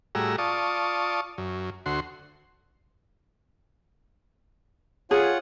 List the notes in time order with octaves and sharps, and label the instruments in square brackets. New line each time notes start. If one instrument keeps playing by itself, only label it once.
[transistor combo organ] A2 G3 F#4 G#4 A#5 E6
F4 D5 A5 C#6 D#6
F#2
D2 F#4 C6
[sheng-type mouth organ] F4 C#5 F#5 [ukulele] G#4